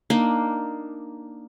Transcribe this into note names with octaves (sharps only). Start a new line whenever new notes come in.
A#3 D4 D#4